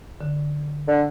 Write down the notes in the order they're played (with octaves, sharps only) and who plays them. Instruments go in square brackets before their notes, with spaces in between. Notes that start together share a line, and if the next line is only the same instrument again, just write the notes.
[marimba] D3
[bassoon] D3